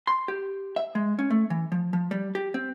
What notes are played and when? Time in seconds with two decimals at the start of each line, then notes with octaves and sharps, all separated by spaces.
0.07 C6
0.28 G4
0.76 E5
0.95 G#3
1.19 C#4
1.30 A3
1.50 E3
1.72 F3
1.93 F3
2.11 G3
2.35 G4
2.54 C4